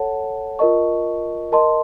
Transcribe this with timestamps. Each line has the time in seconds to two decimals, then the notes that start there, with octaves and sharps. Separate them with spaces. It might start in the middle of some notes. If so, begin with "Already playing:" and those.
Already playing: A4 C#5 F#5 A5
0.59 F4 A#4 D#5 A5 C#6
1.52 A#4 D#5 A5 C6